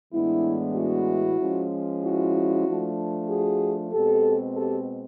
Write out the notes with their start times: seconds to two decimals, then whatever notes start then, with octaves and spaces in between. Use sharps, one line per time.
0.13 A2 E3 G#3 B3 D4 E4
0.76 E4 F#4
1.40 F3 G#3 C#4
2.03 E4 F#4
2.66 F3 A3 D4
3.29 F#4 G#4
3.92 B2 G#3 C4 G4 A4
4.55 G4 A4